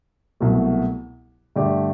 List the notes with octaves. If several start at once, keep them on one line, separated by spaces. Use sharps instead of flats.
C2 B2 F#3 A3
G2 D3 A3 D4 G4